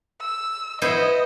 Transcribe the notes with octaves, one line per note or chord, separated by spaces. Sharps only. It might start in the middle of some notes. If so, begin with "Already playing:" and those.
E6
B3 E4 C5 D#5